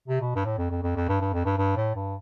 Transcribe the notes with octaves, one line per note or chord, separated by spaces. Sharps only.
C3
B2
G2
A2
F2
F2
F2
F2
G2
G2
F2
G2
G2
A2
G2